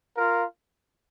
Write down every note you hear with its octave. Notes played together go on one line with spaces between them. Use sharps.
F4 A#4 F5